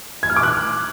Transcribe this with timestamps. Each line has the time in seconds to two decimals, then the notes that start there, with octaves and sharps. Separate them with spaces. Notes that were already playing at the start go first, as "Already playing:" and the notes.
0.23 G#6
0.30 F6
0.36 D6
0.43 F#6